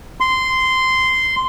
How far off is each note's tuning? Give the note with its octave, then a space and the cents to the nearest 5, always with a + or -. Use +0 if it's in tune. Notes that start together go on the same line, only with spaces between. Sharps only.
C6 -10